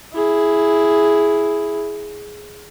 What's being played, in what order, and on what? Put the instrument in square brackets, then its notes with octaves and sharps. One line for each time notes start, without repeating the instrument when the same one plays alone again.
[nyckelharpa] E4 G#4